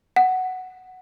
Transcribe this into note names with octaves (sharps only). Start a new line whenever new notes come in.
F#5